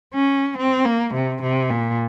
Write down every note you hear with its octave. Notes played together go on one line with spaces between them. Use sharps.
C#4
C4
A#3
C3
C3
A#2